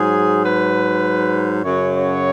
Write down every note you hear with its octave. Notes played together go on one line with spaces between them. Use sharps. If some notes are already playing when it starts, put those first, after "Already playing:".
Already playing: G#2 F#3 G#4
B4
F#2 C#3 F#3 C#5
C#5